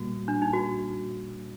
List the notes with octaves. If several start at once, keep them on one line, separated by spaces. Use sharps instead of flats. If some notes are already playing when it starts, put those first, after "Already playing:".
Already playing: A#2 G3 A#3 F#4
D4
D#4
F#4